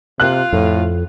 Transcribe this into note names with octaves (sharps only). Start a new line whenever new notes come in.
C3 F4 F#6
F2 A2